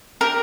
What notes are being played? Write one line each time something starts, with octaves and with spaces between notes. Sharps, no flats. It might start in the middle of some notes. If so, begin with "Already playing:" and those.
D4 G4 A#4